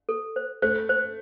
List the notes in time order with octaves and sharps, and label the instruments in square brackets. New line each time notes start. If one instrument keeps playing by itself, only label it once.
[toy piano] A4
C5
[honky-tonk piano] A3 [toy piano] C5
[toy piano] C5